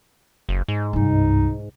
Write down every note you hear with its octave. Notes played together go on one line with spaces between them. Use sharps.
F#1
G#2
C2 G2 D#4